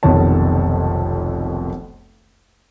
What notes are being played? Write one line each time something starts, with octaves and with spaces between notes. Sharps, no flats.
F1 B1 F2 D#3 C#5 A5